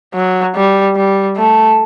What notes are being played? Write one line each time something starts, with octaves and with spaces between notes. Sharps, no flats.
F#3
G3
G3
A3